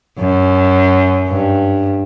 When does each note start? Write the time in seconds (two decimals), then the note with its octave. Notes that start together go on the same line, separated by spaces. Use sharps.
0.19 F#2
1.29 G2